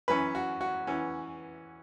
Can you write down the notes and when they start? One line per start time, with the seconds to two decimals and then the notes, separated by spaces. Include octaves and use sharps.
0.08 F#2 E3 C#4 B4
0.35 F#4
0.61 F#4
0.87 E3 C#4